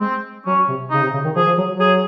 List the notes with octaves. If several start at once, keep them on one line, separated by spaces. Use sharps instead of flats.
G#3 C4
F#3 C#4
C3
C#3 D#4
C3
C#3
D#3
F3 G#4
F3
F#3
F#3
G#4